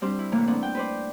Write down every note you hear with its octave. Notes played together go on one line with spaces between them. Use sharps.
G3 C4 D4 G4 C5
E4
A2 C3 E3 A3 A#3
B3 C4 D4
G5
B4 C5 D5